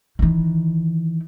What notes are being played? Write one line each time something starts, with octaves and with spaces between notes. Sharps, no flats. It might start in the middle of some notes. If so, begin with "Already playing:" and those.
D#3 E3